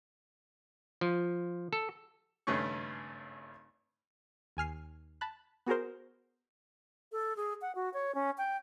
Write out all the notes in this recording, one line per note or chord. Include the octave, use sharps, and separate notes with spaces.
F3
A4
G#1 G2 C#3 A3 C#4 C#6
D#2 G#5 F6 C7
A5 B5 F#6
B3 F#4 G#4 A#4 C5
A4
G#4
F#5
F#4
C#5
C#4
G5